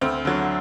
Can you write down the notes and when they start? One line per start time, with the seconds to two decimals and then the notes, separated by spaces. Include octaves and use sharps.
0.01 D2 C4
0.25 D3 F#3